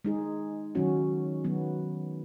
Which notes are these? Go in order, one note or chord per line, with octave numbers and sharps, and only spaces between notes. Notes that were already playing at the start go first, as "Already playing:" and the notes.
G#3 D#4 G#4
D#3 F#3 C#4 F#4
D#3 F#3 B3